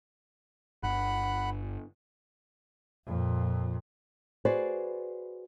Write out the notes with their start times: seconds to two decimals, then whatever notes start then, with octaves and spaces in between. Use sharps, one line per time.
0.83 G1 F#5 B5 F#6
3.06 F2 A#2
4.45 F#4 G#4 B4 C5 D5